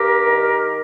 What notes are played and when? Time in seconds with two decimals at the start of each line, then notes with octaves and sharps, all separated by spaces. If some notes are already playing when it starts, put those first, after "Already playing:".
Already playing: G2 G4 A#4
0.27 D#3